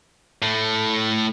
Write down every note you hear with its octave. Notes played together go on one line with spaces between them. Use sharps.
A2 A3